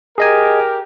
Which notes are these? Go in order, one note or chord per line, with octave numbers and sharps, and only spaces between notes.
G4 G#4 A#4 D#5 G#5